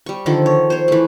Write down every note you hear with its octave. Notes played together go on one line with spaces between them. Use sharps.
G3 C#6
D3 D#3 F3 A4
C#5
C5 C#5
E3 A3